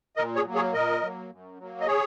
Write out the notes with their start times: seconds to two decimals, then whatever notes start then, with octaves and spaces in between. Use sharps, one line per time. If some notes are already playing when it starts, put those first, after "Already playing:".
0.16 A#2 A#4 D#5
0.36 G#4 C#5
0.45 F#3 A#3
0.55 G#4 C#5
0.73 A#2 A#4 D#5
1.02 F#3 A#3
1.30 F#2
1.58 F#3 A#3
1.81 D#5
1.87 G#4 C#5